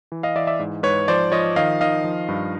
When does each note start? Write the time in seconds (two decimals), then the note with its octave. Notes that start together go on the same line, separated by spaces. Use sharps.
0.12 E3
0.23 D#5 F5
0.35 E3 D5 E5
0.47 D5 E5
0.59 G#2
0.83 G#2 B4 C#5
1.08 F3 C5 D5
1.32 F3 C#5 D#5
1.56 D#3 D#5 F5
1.81 D#3 D#5 F5
2.04 F3
2.29 G2